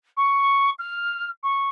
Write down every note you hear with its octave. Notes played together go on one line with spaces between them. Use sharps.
C#6
F6
C#6